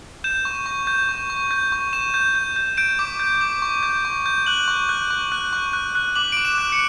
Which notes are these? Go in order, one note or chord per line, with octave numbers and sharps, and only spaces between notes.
G6 E7
C#6
C#6
G6
C#6
C#6
G6
C#6
C#6 E7
G6
G6
G6
G6 D7
D6
G6
D6
C#6
G6
C#6
G6
F#6 F#7
C#6
F#6
C#6
F#6
C#6
F#6
F#6
D6 F#7
D6 D7
E7
F#6
C#7